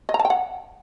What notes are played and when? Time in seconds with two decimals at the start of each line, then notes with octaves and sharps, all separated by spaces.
0.09 D#5
0.14 A#5
0.19 A5
0.25 G5
0.30 F#5